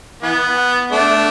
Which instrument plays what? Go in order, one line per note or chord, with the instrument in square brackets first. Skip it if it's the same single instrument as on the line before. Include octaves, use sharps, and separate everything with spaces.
[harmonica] E3 B3
A3 D4